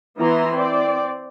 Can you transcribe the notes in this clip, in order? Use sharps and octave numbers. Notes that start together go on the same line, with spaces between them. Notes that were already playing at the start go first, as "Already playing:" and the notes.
E3 B3 E4 A#5 C6
C4 D5